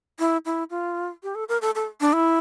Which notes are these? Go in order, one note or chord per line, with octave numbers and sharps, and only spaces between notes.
E4
E4
F4
G4
A4
A#4
A4
A4
D4
E4